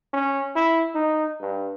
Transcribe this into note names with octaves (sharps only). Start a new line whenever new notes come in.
C#4
E4
D#4
G2